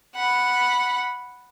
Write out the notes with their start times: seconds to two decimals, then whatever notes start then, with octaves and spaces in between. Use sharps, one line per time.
0.15 F#5 B5